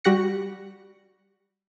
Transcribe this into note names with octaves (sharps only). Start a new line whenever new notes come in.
G3 F#4 G4 F#6 A#6 C#7